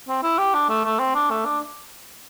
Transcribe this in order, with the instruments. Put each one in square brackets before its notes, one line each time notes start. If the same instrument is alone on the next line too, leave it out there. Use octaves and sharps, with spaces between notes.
[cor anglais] C4
E4
G4
D4
A3
A3
C4
D4
A3
D4